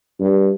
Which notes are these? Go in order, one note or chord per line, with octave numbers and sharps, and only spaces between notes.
G2